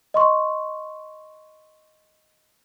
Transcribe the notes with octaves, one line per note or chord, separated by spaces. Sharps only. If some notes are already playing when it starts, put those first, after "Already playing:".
D#5 C6 C#6